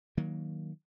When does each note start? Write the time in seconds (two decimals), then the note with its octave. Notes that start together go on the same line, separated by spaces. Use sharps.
0.17 D#3 F#3 A#3